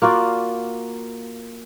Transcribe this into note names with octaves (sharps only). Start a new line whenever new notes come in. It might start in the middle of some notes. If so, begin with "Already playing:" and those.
A#3 F4 F#4 D5